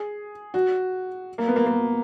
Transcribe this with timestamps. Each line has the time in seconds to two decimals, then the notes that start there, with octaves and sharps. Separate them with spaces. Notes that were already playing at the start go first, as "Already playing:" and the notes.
Already playing: G#4
0.54 F#4
1.38 A#3
1.48 B3
1.56 A#3
1.66 A#3